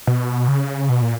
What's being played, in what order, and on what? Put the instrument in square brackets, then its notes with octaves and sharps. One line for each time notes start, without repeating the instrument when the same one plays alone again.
[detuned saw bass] B2
C#3
B2
A#2